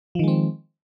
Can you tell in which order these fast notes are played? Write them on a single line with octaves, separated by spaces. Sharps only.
F3 D#3 G#3 C4